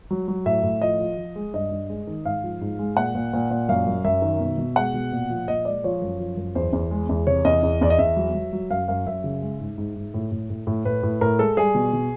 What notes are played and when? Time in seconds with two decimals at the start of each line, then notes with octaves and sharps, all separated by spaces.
0.11 F#3
0.28 F#3
0.46 A2 E5
0.63 A2
0.82 F3 D#5
1.00 F3
1.17 F3
1.36 G#3
1.54 G2 D#5
1.71 G2
1.89 G#3
2.07 D#3
2.25 G#2 F5
2.43 F3
2.61 G#2
2.79 G#3
2.96 A#2 F#5
3.15 A#2
3.33 A#2
3.51 A#2
3.69 F#2 F5
3.86 F#2
4.04 F#2 E5
4.22 D#3
4.40 B2
4.58 B2
4.76 G#3 F#5
4.94 B2
5.12 A#2
5.30 F3
5.48 A#2 D#5
5.65 G#3 D5
5.84 F3 C#5
6.02 F#2
6.20 F3
6.37 F#2
6.55 E2 C5
6.73 E2
6.91 G#3
7.09 E2
7.27 C3 C#5
7.45 E2 D#5
7.63 E2
7.81 E2 D5
7.90 D#5
7.99 E2 E5
8.17 F#3
8.35 F#3
8.53 F#3
8.70 F#2 F5
8.88 F#2 F5
9.06 F#2 E5
9.24 C#3
9.42 G#3
9.60 G#2
9.78 G#2
9.96 G#2
10.14 A2
10.32 A2
10.50 A2
10.67 A2
10.85 A2 B4
11.03 A2
11.21 A2 A#4
11.39 G#3 A4
11.57 G3 G#4
11.75 B2
11.93 B2